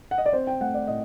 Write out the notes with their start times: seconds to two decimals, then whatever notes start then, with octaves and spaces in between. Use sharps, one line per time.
0.11 F#5
0.18 D#5
0.26 D5
0.32 C4 C5
0.47 G5
0.61 A3 F#5
0.74 D5
0.87 A2 D#5